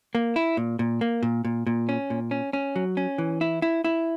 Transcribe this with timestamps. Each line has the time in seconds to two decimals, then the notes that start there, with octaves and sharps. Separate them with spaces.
0.15 A#3
0.36 E4
0.57 A#2
0.79 A#2
1.01 A#3
1.23 A#2
1.45 A#2
1.67 A#2
1.89 C#4
2.10 A#2
2.31 C#4
2.53 C#4
2.76 F#3
2.97 C#4
3.18 E3
3.41 E4
3.62 E4
3.84 E4